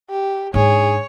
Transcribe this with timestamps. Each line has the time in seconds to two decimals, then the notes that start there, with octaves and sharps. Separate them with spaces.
0.10 G4
0.54 G#2 D4 G#4 C#5